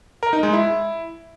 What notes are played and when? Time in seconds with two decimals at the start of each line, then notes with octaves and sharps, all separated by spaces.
0.23 A#4
0.33 D#4
0.43 G#3
0.53 E4